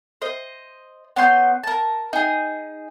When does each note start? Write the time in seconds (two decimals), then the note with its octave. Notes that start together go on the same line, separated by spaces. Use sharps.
0.22 C5 D#5
1.16 B3 C#4 C6 G6
1.63 A#4 A5
2.13 D#4 G#4